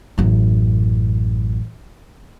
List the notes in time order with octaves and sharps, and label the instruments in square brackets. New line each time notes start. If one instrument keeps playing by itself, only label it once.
[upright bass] A1 F#2